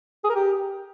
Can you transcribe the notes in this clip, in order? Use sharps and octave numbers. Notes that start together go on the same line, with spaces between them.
G#4
A#4
G4